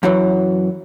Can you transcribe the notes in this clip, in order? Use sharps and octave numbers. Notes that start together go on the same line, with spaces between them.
F#2 E3 F#3